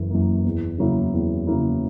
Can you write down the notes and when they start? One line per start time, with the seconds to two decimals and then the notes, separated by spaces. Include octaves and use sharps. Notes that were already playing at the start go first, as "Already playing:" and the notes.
Already playing: F#1 F#2 E3 A#3
0.10 F#2 E3 A#3
0.45 E2
0.78 C#3 F#3 A#3 E4
1.13 E2
1.47 C#3 F#3 A#3 E4